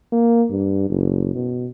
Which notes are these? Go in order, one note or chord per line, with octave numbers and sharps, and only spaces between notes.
A#3
G2
F#1
B2